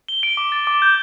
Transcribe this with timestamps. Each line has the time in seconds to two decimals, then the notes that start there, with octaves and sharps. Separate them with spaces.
0.08 G7
0.23 D7
0.37 D6
0.52 A6
0.67 D6
0.82 G6